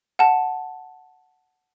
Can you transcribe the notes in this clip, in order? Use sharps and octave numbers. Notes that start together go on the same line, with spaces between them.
F#5 A5